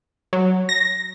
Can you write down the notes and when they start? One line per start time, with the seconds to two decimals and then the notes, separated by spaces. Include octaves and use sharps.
0.33 F#3
0.69 A#6